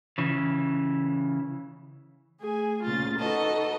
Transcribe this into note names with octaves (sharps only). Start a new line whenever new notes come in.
C#3 E3
A3 G#4 G#5
D2 A#2 C#3 F4 A6
D#4 F#4 A4 B4 D#5 A5